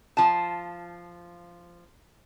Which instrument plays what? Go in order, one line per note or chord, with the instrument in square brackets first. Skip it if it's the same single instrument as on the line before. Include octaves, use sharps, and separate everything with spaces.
[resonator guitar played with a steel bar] F3 A5